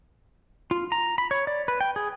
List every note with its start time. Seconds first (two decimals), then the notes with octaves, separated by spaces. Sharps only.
0.71 F4
0.92 A#5
1.18 B5
1.31 C#5
1.47 D5
1.68 B4
1.81 G5
1.96 G#4